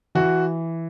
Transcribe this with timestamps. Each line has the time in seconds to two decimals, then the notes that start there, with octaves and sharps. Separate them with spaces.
0.15 E3 F#4